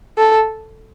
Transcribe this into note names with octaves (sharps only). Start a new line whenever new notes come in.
A4